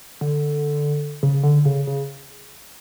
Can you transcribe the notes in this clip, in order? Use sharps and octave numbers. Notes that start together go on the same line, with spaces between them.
D3
C#3
D3
C#3
C#3